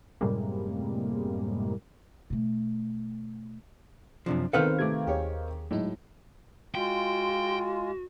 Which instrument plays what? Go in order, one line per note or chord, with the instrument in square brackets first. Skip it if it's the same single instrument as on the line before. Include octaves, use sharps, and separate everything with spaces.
[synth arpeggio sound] F#2 A2 C3 G3 G#3 A#3
[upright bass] B2 A3
[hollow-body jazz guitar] F#2 C3 F3 [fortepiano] D4
[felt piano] D#3 C4 F5 [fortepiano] B3 F6 [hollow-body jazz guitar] A4 B4 C5
[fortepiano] C3 A3 [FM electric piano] D6 G#6
[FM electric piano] D#2 G#4 [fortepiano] G4 C#5
[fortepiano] A2 [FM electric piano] F#3 G#3 D#4
[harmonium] G#3 F4 [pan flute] F#4 [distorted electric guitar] G5